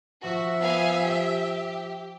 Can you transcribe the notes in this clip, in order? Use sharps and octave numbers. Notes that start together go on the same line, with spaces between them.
F3 F#4 E5
B3 F5 G#5
G4